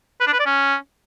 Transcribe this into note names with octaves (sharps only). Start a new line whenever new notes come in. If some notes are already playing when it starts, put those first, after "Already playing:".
B4
D4
B4
D5
C#4